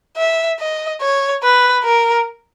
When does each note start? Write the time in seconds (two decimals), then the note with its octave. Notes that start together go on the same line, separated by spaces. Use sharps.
0.17 E5
0.60 D#5
1.01 C#5
1.43 B4
1.85 A#4